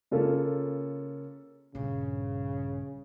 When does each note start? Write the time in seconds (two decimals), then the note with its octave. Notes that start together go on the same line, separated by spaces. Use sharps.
0.11 C#3 A#3 C#4 F4 A4
1.75 A#1 G2 C#3